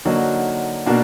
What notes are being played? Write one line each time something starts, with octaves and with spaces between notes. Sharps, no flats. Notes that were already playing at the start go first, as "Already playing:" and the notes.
D3 F#3 A#3 D#4 F#4
B2 A#3 D4 F#4